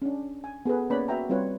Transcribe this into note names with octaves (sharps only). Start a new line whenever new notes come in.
C#4 D4
G#5
B3 G#4 A4 B4
A#3 C#4 B4 C#5 D5 B5
F#4 B4 E5 F#5 G5 A#5
G3 C4 F4 B4 C#5